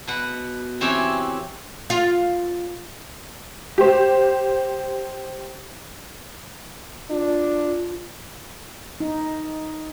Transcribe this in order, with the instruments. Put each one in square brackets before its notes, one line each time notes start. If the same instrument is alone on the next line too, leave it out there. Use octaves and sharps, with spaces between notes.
[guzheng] B2 B4 F#5
E3 C4 C#4 G4 C#5 E5
[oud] F4
[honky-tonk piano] G4 C5
[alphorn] D4 [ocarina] F4
[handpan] D#4